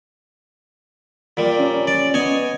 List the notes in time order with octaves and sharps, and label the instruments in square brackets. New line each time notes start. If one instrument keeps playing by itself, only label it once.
[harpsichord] A#2 G3 [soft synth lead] A#4
[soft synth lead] C#4
[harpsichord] D5
[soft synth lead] B3 [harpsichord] C#5 D#5 G#5